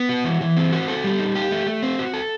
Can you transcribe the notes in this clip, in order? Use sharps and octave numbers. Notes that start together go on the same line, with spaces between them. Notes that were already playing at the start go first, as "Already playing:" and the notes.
Already playing: B3
F#4
E3
E3
C4
F#4
A4
G3
D#4
G4
A3
A3
C4
F#4
A4